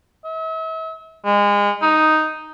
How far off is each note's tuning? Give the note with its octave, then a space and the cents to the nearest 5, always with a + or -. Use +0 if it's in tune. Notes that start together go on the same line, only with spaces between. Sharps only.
E5 -40
G#3 -30
D#4 +0